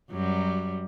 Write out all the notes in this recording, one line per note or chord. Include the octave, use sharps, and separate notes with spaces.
F#2 F#3 G3